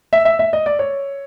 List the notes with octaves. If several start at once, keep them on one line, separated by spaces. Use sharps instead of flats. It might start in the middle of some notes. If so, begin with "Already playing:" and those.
E5
E5
E5
D#5
D5
C#5